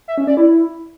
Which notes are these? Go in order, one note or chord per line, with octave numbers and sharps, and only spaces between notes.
E5
C#4
D5
E4